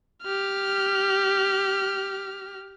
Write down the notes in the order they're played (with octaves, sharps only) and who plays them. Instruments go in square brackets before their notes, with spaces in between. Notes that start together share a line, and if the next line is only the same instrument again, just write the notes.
[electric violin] G4 F6